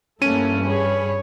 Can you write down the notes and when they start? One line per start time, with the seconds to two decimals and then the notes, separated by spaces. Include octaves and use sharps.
0.22 G2 E3 A3 A#3 C#4 A4 D#7
0.67 G#4 C#5 B5